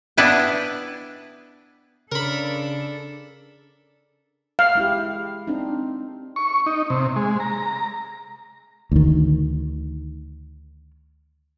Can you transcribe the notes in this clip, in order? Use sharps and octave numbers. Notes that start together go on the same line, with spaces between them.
B3 D4 E4 B4 G5
C#3 D4 A4 A#4 B5
F5
G#3 E4 G4
C4 D4 D#4
C#6
D#4
C3
G#3
A#5
D2 D#3